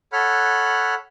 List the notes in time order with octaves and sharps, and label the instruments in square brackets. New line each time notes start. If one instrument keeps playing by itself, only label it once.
[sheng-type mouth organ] A4 C#5 F#5 B5 F6 F#6